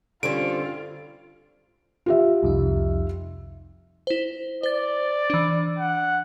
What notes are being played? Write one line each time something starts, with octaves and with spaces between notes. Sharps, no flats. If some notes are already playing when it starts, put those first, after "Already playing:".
G2 D3 C4 C#4 F4 D7
F4 G4 E5
C2 F2 D#4
E4 C5
C5 D5 A6
E3 D4
F#5